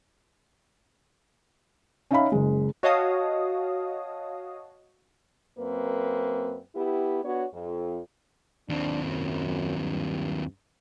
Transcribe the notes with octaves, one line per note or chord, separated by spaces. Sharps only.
C#4 D#4 C#5 E5 F5 B5
F#1 G#3
F#4 C#5 D#5 F5 A5 D#6
F#2 A#3 C4 B4
B3 E4 G4
B3 D4 F#4 C#5
F2
D#2 C4 D4
F#2
G2